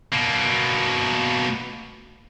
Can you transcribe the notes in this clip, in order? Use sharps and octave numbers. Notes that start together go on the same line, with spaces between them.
B2 A#3